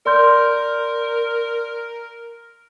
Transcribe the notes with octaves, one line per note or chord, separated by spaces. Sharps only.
A#4 D5 C6 G6